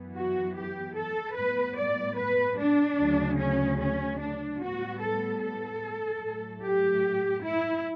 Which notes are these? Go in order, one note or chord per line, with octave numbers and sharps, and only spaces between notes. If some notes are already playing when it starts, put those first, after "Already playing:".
Already playing: F#2 E3 B3
F#4
G4
A4
A2 G3 B3 B4
D5
B4
D4
D2 C#3 F#3
C#4
C#4
D4
A2 G3 B3 F#4
A4
A4
A2 F#3 A3
G4
E4